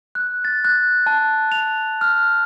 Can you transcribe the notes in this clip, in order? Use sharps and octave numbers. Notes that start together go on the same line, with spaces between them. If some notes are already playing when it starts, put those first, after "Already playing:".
F#6
A6
F#6
A5
F7
F6